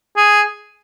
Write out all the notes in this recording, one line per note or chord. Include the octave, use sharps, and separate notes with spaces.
G#4